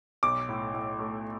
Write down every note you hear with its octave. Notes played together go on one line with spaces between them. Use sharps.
B1 D6
A2
A2
A3